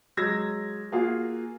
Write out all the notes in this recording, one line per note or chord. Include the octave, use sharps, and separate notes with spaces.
F#3 G#3 E6 G#6 A#6
A#3 F4 F#4 G#4